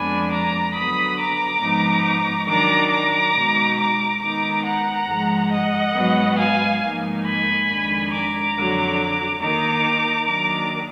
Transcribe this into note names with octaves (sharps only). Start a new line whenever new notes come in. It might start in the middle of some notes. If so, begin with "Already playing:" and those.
Already playing: F2 F3 G#3 B3 D4 G#5 B5
A#5 D6
D3 F#3 B3 B5 D#6
A#5 D6
G#2 F3 B3 D#4
D#3 F#3 D4 A#5 D6
A#5 D6
B2 G#3 D#4
A#5 D6
D#3 G#3 B3 D#4 A#5 D6
F#5 A#5
G#2 F3 G#3
D#5 F#5
G#2 F#3 B3
F5 G#5
G#2 F3 A#3 D#4
G#5 B5
F2 D#3 G#3 D4
A#5 D6
F2 D3 F#3
D#3 A#3 D#4 A#5 D6
D#3 F#3 A#3 D4 A#5 D6